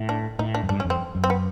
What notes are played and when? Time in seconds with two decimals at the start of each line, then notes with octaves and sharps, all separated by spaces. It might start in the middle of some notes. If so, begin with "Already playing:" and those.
Already playing: A2
0.09 D4
0.39 A2 D#4
0.55 D4
0.63 F#2
0.69 G2 D4
0.80 C#4
0.85 F2
0.90 C4
1.15 F#2
1.24 C4
1.30 B3